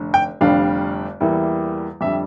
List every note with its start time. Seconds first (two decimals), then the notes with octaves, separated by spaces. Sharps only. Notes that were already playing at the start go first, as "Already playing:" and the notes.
Already playing: F1 D3
0.14 G5
0.41 F1 F2 D3 G3 D4 F5
1.20 E2 E3 G3 A#3 E4
2.01 F2 D3 G3 E5